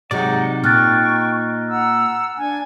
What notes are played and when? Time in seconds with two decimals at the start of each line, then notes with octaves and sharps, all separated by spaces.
0.11 C3 F#3 G#3 D#4 D5 F#5
0.64 A#2 G5 C#6 F6 F#6 A6
1.70 F#5 A#5 E6
2.37 D4 G#5